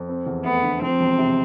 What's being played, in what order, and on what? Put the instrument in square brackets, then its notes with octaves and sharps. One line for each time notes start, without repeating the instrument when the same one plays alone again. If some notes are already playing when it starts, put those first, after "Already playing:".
Already playing: [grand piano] F2
C4
E2
[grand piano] A3 [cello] B3
[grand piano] D3
[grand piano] F3 [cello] C4
[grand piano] E1
C3